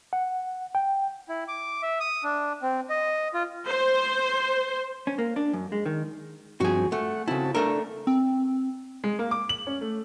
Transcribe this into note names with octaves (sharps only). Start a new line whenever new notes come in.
F#5
G5
E4
D6
E5
D#6
D4
C4
D#5
F4
C5
C#4
A#3
D4
F#2
G#3
D#3
G2 F3 C4 F#4 G#4
A3 F#5
C#3 C4 E4 F#4 A5
A3 D4 A4 A#4
C4
G#3
A#3
D6
F#7
C#4
A3